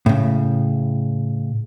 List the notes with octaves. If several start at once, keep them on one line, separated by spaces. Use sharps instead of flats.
A2 C#3